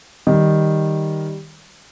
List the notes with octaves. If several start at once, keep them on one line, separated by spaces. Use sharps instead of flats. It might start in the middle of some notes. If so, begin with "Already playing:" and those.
D#3 G3